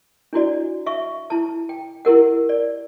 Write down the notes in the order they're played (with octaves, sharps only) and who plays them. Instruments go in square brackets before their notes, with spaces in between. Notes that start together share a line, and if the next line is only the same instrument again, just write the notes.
[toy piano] D4 E4 F#4 D5
E5 F5 C#6
E4 A5
G5
E4 G4 A#4 F#5
D5